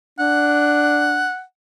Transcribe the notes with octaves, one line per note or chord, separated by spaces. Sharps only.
D4 F#5